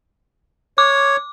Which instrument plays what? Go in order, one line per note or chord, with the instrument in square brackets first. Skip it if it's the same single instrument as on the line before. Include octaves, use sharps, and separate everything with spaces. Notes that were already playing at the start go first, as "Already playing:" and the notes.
[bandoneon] C#5 [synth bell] D6